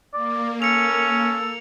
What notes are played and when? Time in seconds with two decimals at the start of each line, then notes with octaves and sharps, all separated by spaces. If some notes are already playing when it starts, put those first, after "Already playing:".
0.14 A#3 D5
0.62 C#4 A4 C#7 F7